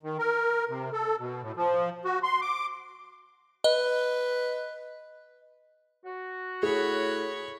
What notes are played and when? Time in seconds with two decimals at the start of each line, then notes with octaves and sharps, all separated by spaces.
0.03 D#3
0.19 A#4
0.69 C3
0.93 A4
1.19 B2
1.42 A2
1.56 F3
2.05 F#4
2.23 C6
2.42 D6
3.64 B4 D#5
6.05 F#4
6.63 A2 G#4 C#5 B5